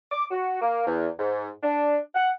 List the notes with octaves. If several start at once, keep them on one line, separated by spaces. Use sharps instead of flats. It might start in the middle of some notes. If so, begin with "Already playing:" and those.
D6
F#4
A#3
E2
G#2
D4
F#5